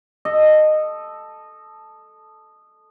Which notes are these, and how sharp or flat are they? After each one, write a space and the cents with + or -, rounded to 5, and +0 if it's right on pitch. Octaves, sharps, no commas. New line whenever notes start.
A4 -5 D#5 -15